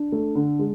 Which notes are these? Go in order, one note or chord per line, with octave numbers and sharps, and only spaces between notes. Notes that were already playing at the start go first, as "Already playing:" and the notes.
Already playing: D4
A3
D3
G#3